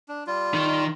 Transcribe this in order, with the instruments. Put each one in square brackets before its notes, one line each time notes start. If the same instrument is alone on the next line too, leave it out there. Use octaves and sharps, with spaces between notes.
[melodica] D4
G3 F4
[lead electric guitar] D#3